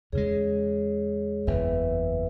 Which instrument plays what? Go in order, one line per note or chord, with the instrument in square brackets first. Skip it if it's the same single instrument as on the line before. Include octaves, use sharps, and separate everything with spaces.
[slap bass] E2 C#3 G#3 [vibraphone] G#4 C#5
[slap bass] F#1 E2 E3 B3 [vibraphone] B4 E5